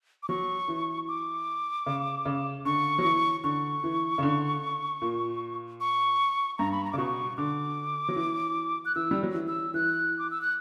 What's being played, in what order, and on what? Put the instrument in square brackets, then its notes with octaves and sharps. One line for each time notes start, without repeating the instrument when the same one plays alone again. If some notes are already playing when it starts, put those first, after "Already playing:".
[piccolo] D6
[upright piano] F#3 [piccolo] C#6
[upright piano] E3
[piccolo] D6
[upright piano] C#3
C#3
[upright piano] D3 [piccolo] C#6
[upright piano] F#3
E3
[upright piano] D3 [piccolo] C#6
[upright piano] E3
C#3
D3
A#2
[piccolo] C#6
[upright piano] G2 [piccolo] A#5
[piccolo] B5
A#5
[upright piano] C#3 [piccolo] D6
[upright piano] B2 [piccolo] C#6
[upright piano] D3 [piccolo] D6
[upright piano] F#3
E3
[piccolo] F#6
[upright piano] E3 [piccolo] E6
[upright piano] G3
F#3
E3
[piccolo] E6
[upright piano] E3 [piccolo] F#6
[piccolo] D6
E6
F#6